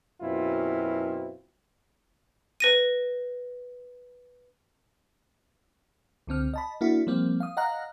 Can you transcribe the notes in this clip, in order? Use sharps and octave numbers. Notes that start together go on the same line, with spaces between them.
F#2 B2 C4 E4 F4
B4 A#6 D#7
C#2 D3 C4 F6
D#5 A5 B5
A#3 D4 E4 F#4
F3 G3 A#3 C4
F5 D#6
D#5 F5 F#5 A#5 F#6